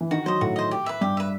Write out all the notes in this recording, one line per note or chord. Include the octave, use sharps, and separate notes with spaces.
E3
D#3 F#4
F#3 C5 D#5
A2 F#4
C5 D#5
G4
B4 E5
G2 G4
B4 E5